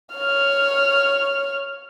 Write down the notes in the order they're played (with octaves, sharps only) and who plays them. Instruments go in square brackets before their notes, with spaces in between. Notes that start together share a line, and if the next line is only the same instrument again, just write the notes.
[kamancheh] C#5 F6